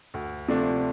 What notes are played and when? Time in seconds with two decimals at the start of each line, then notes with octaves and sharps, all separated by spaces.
0.14 D2
0.48 C3 F3 A3 D4